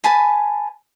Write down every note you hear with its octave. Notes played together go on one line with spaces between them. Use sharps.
B4 G#5 A5 B5